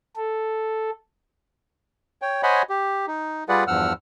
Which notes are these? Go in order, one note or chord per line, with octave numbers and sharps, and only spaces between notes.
A4
C#5 G5
C5 C#5 D#5 F#5 G#5 B5
G4
D#4
G3 F4 G#4 B4 D5 F#5
E2 G2 F3 F#5 E6 F6